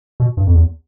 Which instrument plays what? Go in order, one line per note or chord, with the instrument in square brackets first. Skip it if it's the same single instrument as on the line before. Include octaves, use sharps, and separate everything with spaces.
[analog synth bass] B2
G2
F2
E2